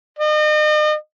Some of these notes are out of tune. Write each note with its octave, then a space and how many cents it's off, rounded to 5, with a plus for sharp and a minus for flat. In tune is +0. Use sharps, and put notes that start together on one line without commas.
D#5 -40